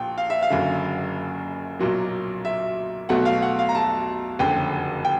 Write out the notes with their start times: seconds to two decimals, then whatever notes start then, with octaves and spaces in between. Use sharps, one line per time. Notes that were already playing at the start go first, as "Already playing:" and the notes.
Already playing: A#1 A#2 G5
0.18 F5
0.30 E5
0.43 F5
0.50 F#1 F#2 D3
1.79 B1 A#2 F#3 A#3
2.45 E5
3.09 B1 B2 F#3 A3 F#5
3.25 F5
3.42 F#5
3.59 F5
3.69 A#5
3.75 A5
4.39 F#1 F2 D3 G5
5.05 G5